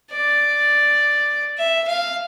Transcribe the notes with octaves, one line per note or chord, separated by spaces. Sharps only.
D5
E5
F5